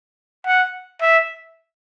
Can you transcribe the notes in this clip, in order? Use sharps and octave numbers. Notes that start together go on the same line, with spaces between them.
F#5
E5